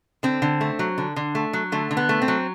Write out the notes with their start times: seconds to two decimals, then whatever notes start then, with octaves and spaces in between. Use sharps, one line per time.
0.23 D3 C4
0.42 D3
0.61 A3
0.79 F#3
0.98 D3
1.16 D3
1.35 A3
1.53 F#3
1.72 D3 A3
1.91 D3
1.97 B3
2.09 A3
2.22 C4
2.28 F#3